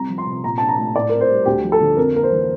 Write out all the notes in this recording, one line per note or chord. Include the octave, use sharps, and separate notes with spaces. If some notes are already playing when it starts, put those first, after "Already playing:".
Already playing: C2 A#5
F3
C6
C3
A#2 A#5
D4 A5
A#5
A3
A2 D5
C4 A#4
C5
G3
D2 G4
F3
A4
D3
F2 A#4
A#3 A#4
C5
E3